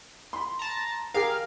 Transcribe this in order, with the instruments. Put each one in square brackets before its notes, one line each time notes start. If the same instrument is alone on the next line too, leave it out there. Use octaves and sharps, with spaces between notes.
[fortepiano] B5 C6
[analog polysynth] A5 A#5
[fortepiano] G4 G#4 A#4 [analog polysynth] F5